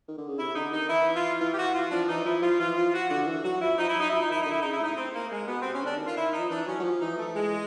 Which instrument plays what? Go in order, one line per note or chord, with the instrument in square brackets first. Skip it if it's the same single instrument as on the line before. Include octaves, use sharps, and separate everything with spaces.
[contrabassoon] D#3
D3
C#3
[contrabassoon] C3 [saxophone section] E4
[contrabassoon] D3 [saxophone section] D#4
[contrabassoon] D#3 [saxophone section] D#4
[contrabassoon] E3 [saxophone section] E4
[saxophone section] F4
[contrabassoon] E3 [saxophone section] F4
[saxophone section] G4
F#4
F4
[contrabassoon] F3 [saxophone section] D4
[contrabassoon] E3 [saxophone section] D#4
[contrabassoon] F3 [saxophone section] E4
[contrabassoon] F3 [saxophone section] F4
[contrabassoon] E3 [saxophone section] F4
[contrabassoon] F3 [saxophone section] F4
[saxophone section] F#4
[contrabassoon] D3 [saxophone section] F#4
[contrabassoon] E3
[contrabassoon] F#3 [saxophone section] F#4
[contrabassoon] F3 [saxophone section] E4
[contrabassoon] F3 [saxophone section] D#4
[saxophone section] E4
[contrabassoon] F#3 [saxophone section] D#4
[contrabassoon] F3 [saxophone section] E4
[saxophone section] D#4
[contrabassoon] D#3 [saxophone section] E4
[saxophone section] D#4
[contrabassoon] D3
[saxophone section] E4
[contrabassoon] C#3 [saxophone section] D#4
[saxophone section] E4
[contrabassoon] A2 [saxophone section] D#4
[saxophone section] C4
A#3
G#3
[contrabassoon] B2 [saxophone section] B3
[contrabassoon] C3 [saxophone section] C4
[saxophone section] C#4
[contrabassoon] D3 [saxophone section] D4
[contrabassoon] D#3
[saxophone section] F4
E4
D#4
[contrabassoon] F3
[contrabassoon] E3 [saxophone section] D4
[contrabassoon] F#3 [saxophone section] C#4
[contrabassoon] F#3
F3
[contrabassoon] E3 [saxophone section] D#4
[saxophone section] A3
G#3